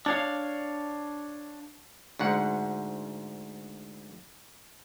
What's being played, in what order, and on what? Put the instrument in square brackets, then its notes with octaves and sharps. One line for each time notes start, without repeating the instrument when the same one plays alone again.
[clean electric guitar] D4 C#5 F5
[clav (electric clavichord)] D2 G#2 F#5